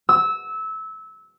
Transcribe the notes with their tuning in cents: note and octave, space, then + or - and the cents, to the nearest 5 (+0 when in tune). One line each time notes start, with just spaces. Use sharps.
E6 -20